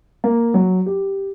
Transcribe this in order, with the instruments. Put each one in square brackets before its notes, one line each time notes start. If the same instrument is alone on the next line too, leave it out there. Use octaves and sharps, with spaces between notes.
[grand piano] A#3
F#3
G4